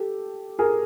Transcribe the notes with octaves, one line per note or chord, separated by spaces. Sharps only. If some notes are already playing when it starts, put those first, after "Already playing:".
Already playing: G4 A4
G#4 A#4